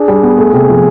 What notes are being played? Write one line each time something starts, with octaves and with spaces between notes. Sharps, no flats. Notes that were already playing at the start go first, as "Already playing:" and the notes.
Already playing: D4 G#4
G3
B3
A3
C3
F3